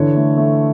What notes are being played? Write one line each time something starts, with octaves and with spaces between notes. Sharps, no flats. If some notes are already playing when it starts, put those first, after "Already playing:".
Already playing: D3 E3 C#5
A3
A3